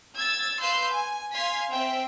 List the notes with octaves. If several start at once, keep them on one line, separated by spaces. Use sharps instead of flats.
E6 G#6 A6
B4 F5 C6 E6 G6
G#5
F5 G#5 C6 G#6 B6
C4 E5 G5